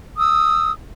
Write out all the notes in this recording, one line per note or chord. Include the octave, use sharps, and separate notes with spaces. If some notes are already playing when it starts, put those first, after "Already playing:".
D#6 E6